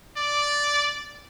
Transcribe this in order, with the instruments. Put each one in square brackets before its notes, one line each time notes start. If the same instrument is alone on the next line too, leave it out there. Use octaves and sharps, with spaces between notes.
[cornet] D5